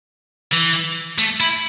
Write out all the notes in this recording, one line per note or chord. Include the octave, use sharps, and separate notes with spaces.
E3
A3
E4